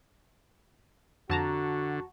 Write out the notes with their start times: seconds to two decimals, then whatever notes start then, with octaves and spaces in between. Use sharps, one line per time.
1.30 F2 D3 F#4 A5 A#5